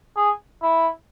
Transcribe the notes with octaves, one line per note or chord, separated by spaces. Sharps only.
G#4
E4